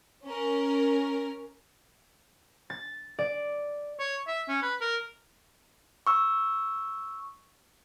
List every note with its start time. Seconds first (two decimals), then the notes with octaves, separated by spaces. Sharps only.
0.25 C#4 A#4
2.70 A6
3.19 D5
4.00 C#5
4.27 E5
4.48 C#4
4.62 B4
4.81 A#4
6.07 C#6 E6